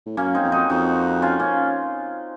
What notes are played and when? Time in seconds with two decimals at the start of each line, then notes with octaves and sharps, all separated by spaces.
0.06 A2
0.17 F#2 A#3 C#4
0.35 C4 D#4
0.44 F2
0.52 D#4 F#4
0.70 F2 D#4 F#4
1.22 C#4 F4
1.40 A#3 C#4